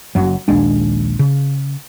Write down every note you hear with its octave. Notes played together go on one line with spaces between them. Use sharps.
F#1 F#2 F#3
A#1 D#2 G#3 D4
C#3